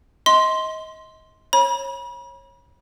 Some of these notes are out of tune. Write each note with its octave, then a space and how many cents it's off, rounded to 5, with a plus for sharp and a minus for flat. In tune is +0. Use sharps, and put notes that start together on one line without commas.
D#5 +30 C6 +0
C#5 -25 B5 -40